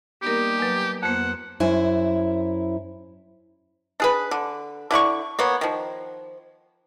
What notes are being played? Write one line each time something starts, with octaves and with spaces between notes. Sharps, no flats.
G3 A#3 B3 D#4 G4 A#4
F#3 B4 G#5
F2 A#3 B3 C5 F#5
F#2 E4 C5 G#5
D4 G#4 B4
D3
D3 E4 D5 C#6
A#3 B3 C#5
D#3 F3